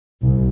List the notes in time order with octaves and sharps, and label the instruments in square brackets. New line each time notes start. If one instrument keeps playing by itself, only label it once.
[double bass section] C2